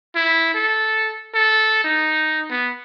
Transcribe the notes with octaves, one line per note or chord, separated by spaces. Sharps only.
E4
A4
A4
D#4
B3